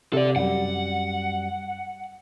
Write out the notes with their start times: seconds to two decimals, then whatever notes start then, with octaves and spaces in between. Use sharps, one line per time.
0.13 C3 A4 D5
0.36 F#2 G3 F#5